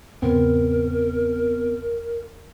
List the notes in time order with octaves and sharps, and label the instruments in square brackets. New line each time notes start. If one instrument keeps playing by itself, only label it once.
[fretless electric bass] E2 G#2 C#3 [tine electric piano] B3 C4 [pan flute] A#4